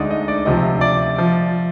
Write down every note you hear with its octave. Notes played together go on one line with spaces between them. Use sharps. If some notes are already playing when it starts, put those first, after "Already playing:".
Already playing: D2 D3 G#3 D#4 D5 D#5
D#5
D5
D2 C3 F3 D#5
D5
F3